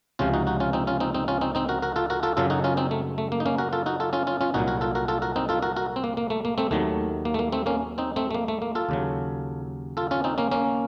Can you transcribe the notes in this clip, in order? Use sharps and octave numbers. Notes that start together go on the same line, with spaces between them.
C#2 C3 F3 C#4 F4
D#4 F#4
D#4 F#4
C#4 F4
C4 D#4
C#4 F4
C4 D#4
C4 D#4
C#4 F4
C4 D#4
C4 D#4
F#4 A#4
F#4 A#4
F4 A4
F#4 A#4
F4 A4
F#2 C#3 F#3 F4 A4
D#4 F#4
C#4 F4
C4 D#4
A3
A3
A#3
D#4
A#3 C#4
F#4 A#4
F4 A4
D#4 F#4
F4 A4
C#4 F4
C#4 F4
C#4 F4
C2 A#2 F#3 D#4 F#4
F#4 A#4
F4 A4
F#4 A#4
F4 A4
F#4 A#4
C4 D#4
F4 A4
F#4 A#4
F#4 A#4
C4
A#3
A#3
A3
A#3
A3 C4
D#2 D#3 F#3 A3
A#3
A3
A#3
A3 C4
A#3 C#4
C4 D#4
A3 C4
A3
A#3
A3
A#3
F4 A4
D#2 C#3 F#3
F4 A4
C#4 F4
C4 D#4
A#3 C#4
A#3 C#4